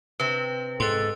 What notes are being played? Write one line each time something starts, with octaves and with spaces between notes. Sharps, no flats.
C3 C4 B4
G#2 A4 C6 F#6